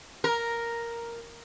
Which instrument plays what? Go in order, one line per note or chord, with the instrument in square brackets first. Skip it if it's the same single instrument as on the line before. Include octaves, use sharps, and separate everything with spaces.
[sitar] A#4